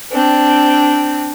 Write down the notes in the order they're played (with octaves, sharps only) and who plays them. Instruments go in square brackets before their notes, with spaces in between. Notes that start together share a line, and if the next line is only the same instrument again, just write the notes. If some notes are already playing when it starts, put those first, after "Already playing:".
[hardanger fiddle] C4 D4